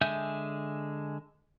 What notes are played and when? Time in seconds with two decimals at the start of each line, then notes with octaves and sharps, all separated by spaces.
0.01 D3 G#3 E5 G#5 G6